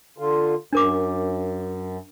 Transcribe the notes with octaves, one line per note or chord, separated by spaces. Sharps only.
D3 F4
F#2 D4 A#4 D6